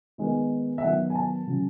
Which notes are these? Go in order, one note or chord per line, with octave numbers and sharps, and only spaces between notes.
D#3 G#3 B3
E5
D#3 F#3 B3 F#5
G#5
A5
C#3 F#3 C#4